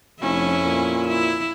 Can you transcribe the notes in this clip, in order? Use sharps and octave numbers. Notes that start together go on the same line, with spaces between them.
F1 F2 C#4 E4
A#2
E4